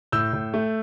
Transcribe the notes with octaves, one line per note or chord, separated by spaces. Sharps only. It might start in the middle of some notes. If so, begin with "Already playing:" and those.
A2 E6 G6
A2
A3